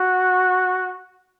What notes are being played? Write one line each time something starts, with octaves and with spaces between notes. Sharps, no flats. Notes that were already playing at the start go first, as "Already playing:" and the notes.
Already playing: F#4